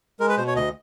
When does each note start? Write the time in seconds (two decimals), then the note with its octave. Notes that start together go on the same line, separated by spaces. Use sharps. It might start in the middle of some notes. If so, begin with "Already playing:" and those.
0.20 G#3 A#4
0.29 B4
0.37 B2 C5
0.47 C#5
0.56 D2 D#5